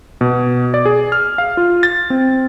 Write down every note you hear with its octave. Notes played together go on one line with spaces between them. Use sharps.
B2
D5
G#4
F6
F5
F4
A6
C4